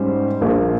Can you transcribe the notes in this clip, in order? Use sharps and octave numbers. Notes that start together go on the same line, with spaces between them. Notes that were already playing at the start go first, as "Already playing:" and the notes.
Already playing: G#2 G3 C#4 C5
A#1 A#2 F3 A#3